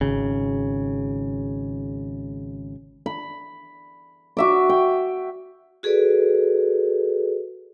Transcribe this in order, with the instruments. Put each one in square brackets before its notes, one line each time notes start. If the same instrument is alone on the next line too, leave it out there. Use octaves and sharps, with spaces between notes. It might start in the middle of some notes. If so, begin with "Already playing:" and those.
[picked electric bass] G#1 C#3
[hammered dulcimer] B5
F#4 E5 D6
G5
[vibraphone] F#4 G#4 A4 B4 D5